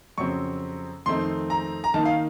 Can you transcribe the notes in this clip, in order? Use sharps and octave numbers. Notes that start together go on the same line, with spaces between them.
F2 C#3 F#3 C4 C#6
F2 D#3 A3 C4 D#4 C6
A#5
A#5
D#3 A#3 D#4 A5
F5